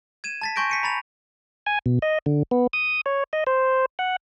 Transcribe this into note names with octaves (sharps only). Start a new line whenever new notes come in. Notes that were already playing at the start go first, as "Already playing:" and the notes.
G#6 D#7 E7
A5 A6 B6
G#5 C6 C#6 G6 A#6 D7
B6 C#7 D#7
A#5 B5 A6 F7
G#5
B2
D#5
D3
B3
D#6
C#5
D#5
C5
F#5